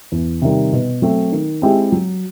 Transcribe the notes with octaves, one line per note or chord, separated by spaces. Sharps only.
E2
C3 D#3 G3
B2
F#3 A3 C4
D#3
G#3 C4 E4 G4
F#3